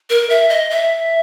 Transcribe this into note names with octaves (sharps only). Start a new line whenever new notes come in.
A#4
E5
D#5
E5